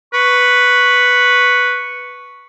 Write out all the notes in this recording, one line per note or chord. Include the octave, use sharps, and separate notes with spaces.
B4 C#6